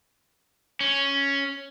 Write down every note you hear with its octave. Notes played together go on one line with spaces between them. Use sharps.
C#4